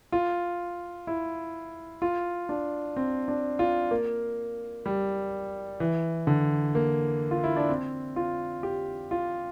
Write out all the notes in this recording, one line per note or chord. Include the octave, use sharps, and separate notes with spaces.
F4
E4
F4
D4
C4
D4
F4
A#3
G3
E3
D3
A#3
F4
E4
D4
C4
F4
G4
F4